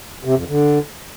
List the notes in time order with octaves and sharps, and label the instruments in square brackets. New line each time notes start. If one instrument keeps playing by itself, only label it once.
[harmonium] C3
F2
D3